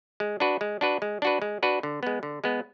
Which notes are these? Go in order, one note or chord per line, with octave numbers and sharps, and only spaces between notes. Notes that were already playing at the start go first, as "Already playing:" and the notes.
G#3
D4 F#4 B4
G#3
D4 F#4 B4
G#3
D4 F#4 B4
G#3
D4 F#4 B4
D3
G#3 B3
D3
G#3 B3